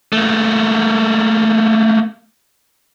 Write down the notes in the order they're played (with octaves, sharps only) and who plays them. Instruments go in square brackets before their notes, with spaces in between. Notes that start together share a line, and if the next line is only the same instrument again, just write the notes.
[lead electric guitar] A3 A#3